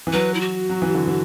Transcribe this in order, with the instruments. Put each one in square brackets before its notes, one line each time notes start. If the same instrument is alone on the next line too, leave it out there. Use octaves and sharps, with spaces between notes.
[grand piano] E3
[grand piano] F#3 [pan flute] B4
[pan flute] E4
F#4
[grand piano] F#3
E3
D3
E3